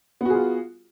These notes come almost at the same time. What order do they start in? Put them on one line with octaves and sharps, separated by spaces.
B3 F#4 G#4 F4